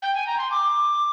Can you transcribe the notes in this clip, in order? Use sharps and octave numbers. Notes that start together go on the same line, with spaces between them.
G5
G#5
A#5
C6
D6